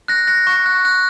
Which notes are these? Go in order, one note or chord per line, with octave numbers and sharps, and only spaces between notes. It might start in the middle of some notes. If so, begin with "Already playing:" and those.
F#6 A#6
F#6 A#6
C#6
F#6
F#6